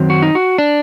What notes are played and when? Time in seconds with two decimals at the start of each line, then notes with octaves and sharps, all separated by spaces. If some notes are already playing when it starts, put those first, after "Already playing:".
Already playing: F#2 D#3 F#3 C4
0.10 F#4
0.22 D#4
0.35 F#4
0.58 D4